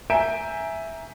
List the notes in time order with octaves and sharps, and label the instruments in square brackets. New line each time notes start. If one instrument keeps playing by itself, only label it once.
[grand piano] E5 G#5 A#5 G6 D7 E7